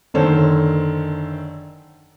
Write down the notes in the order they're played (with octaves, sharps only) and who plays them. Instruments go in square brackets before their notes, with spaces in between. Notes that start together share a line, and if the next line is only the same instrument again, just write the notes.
[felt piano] F#1 D3 D#3 A4 C5 C#5